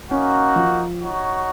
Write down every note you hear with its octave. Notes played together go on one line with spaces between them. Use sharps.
A#3 C#4 D#4 F#4
F3
D#4 F#4 C#5